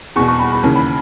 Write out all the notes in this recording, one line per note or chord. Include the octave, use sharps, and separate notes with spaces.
E2 B2 C#6
C#6
B5
B5
D#2 C#3 E3
B5